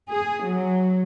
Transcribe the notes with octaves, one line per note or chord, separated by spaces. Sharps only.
G#4
F#3